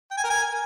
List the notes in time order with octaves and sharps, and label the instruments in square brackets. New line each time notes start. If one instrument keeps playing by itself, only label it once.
[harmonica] G5
G#5
A#4
G#5